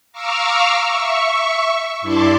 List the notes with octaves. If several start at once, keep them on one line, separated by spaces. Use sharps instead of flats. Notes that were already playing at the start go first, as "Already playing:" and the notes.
F5 A#5 C#6 D6 E6 F6
E5 C#6
G2 E4 D5 A5 C6 D6